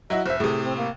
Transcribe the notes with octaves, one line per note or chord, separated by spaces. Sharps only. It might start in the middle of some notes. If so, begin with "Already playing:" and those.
F#3 E4 F#4 D#5
F1 C5 E5
A2 C3 G#4
C4
A#3